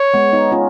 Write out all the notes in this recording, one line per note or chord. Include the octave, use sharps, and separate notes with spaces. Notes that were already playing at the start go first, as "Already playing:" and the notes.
Already playing: C#5
G#3 B3
B3 D#4
C#4 F4